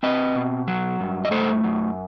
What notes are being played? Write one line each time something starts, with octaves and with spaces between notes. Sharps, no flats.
C4 B4 D#5
B2
F#3
G2
D#5
A3 A4 C5
F#2